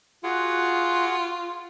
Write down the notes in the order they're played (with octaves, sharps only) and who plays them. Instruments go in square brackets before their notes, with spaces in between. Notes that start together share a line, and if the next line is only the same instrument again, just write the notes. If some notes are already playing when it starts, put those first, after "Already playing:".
[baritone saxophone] F4 [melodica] F#4 G#4 F#5